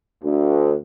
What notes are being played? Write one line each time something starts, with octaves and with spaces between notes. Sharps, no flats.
D2